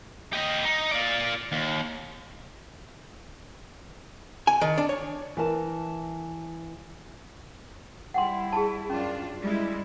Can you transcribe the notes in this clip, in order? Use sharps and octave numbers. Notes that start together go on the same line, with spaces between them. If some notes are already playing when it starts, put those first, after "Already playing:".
G4 D#5
D#4
F4 D5
D#2
G#5
D#3
D4
C#5
E3 A#4 A5
G3 E4 F#5 G5 C6
G#4 A5
F#2 C#4 D4 F4
G3 G#3 E4